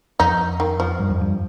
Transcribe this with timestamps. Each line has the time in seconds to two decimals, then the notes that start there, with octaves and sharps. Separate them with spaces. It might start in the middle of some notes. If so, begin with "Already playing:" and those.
0.20 F2 D#4
0.60 D#3
0.80 F3
1.00 G2
1.10 F2
1.21 G2